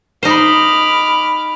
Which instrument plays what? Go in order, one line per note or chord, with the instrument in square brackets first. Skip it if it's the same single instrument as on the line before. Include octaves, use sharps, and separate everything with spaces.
[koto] D#4 C5 [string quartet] B5 D6 F6